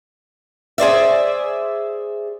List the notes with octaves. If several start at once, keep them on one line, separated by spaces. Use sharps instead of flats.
G#4 C5 D5 E5